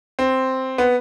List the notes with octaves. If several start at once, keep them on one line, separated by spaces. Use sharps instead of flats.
C4
B3